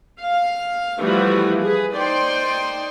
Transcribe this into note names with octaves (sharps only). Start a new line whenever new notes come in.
F5
E3 F3 G3 A3 F#4
G#4 B4
D#4 C5 D5 G5 C6